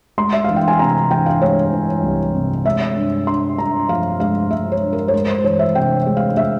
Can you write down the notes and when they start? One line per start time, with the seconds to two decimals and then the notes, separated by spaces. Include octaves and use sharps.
0.18 G#3 C6
0.33 E5
0.44 E3 F5
0.56 G5
0.68 G#5
0.79 C3 A#5
1.11 E3 G5
1.26 F5
1.42 G#3 C#5
1.73 E3
2.03 C2
2.35 C3
2.65 G#3 E5
2.96 G2
3.27 G2 C6
3.58 G2 A#5
3.89 F3 F5
4.20 G#3 F5
4.51 G#3 E5
4.72 C#5
4.83 G2
4.93 A#4
5.08 C#5
5.14 G#3 C5
5.38 C5
5.44 E3 C#5
5.59 E5
5.75 C3 G5
6.07 G#3
6.17 F5
6.37 G#3 E5